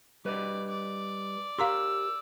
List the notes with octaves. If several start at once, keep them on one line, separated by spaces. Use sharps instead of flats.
G3 B4 D5 D#5
D5
G4 A#4 F5 A#5 C6 E6